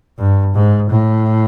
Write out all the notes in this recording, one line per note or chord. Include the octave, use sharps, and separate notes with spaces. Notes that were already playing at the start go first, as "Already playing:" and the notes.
G2
G#2
A2